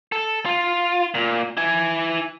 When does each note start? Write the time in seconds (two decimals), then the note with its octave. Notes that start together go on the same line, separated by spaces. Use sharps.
0.12 A4
0.45 F4
1.15 A#2
1.57 E4 G#5